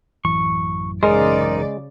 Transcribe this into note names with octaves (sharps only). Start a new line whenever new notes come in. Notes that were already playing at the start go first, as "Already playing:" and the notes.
A1 F#2 E3 C#6
C#3 G#3 D#4 A#4 C5 D5